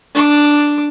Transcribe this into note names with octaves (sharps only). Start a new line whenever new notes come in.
D4 D6